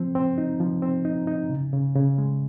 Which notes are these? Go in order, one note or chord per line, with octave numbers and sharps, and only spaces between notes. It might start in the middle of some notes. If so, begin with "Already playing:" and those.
Already playing: F3 C4
C4
D#4
F3
C4
D#4
D#4
C#3
C#3
C#3
G#3